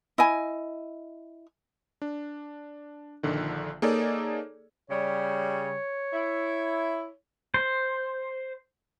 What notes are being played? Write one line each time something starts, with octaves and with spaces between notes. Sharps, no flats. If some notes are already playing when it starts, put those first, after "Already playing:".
E4 D#5 G#5
D4
A#1 A#2 D3 D#3
A#3 D#4 G#4 A4 C#5 D5
C#3 G3 C#5
E4
C5